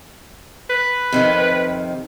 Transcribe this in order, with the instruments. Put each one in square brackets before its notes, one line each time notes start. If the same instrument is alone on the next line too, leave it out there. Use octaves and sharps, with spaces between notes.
[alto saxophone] B4
[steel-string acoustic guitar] F2 C3 D#3